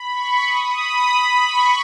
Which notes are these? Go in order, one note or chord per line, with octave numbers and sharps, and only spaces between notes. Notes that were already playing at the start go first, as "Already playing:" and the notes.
Already playing: B5
C#6
D#6
B5
C#6